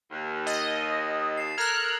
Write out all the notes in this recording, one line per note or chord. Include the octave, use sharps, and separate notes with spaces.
D#2
D#5 D#6 A6
C7 E7
A4 A#4 F6 F#6 G#6